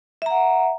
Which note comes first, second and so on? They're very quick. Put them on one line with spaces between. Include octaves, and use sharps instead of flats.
E5 A#5 F#5